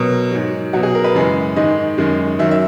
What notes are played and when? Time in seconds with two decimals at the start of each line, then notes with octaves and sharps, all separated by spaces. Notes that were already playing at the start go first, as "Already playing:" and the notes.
Already playing: B2 F#3 A#4
0.32 G#2 F#3
0.73 B2 F#3 F#4
0.83 G#4
0.95 A#4
1.04 B4
1.15 F#2 C#3 E3 G#3
1.56 G#2 D#3 G#3 D#5
1.98 F#2 D#3 G#3
2.39 F#2 D#3 F#3 E5
2.51 E5